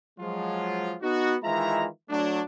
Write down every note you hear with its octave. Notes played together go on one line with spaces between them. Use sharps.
F3 F#3 G#3 F4
B3 D#4 F#4
D#3 E3 G#3 F4 E5 A#5
F#3 A3 D4